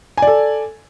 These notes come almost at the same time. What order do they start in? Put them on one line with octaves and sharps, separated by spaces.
G#5 D5 A4